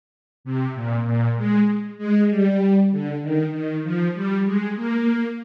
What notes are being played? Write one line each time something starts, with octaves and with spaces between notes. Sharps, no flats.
C3
A#2
A#2
G#3
G#3
G3
D3
D#3
D#3
F3
G3
G#3
A#3